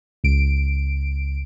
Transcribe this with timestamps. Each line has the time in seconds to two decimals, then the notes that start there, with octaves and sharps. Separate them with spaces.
0.24 C#2 D7